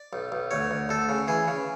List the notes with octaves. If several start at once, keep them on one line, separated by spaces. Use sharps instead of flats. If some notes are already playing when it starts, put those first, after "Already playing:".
Already playing: D5
B1
B1
D2 C#5
D2
D2 A4
C#3
E3 G#4
C#3